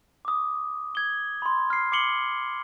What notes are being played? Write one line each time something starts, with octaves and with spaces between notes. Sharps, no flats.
D6 D#6
G#6 G7
B5 C6
F6 C7
D6 C7 C#7 F#7 G7